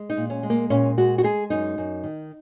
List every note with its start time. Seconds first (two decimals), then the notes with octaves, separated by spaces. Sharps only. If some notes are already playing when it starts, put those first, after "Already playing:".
Already playing: G#3
0.10 D#4
0.17 A#2
0.30 C#4
0.43 G#3
0.50 A#3
0.70 A#2 C#4
0.98 G#3 F#4
1.18 F#4
1.23 G#3 G#4
1.50 F#2 D#4
1.78 F#2
2.03 D#3